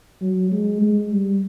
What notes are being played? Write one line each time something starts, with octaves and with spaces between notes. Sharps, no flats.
F#3
G#3
G#3
G3